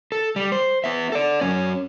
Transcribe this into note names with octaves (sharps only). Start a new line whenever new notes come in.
A4
G3
C5
B3 E5
A4 D5
F#2 C#4